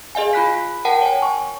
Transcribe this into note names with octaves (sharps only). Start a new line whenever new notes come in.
G#4 D#5 F5 G#5
F4 B5 F#6 B6
A#4 F#5 G5 A5
C#5 G#5
C#6